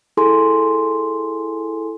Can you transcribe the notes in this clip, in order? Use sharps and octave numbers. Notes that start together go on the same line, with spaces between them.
E4 G#4 A4 G#5 C6